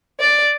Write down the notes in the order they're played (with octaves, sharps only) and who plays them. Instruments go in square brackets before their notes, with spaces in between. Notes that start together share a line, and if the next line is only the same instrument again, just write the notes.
[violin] D5